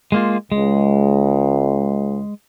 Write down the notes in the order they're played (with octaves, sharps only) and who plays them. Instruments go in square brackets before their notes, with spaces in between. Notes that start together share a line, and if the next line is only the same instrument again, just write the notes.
[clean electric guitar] G#3 A#3 F4
[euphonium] C#2 [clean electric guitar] G#3